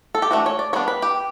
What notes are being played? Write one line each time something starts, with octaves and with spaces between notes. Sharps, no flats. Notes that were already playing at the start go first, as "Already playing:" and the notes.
A4
G4
E3 A3 D4 F#4
C#5
D5
G3 B3 D4 C#5
B4
G4